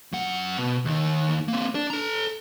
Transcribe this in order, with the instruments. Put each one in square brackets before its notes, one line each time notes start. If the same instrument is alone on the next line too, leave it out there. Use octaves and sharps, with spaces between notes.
[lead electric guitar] F#2 F#5
B2
D#2 D#3
A#3 C4
D4 D5
A4 A#5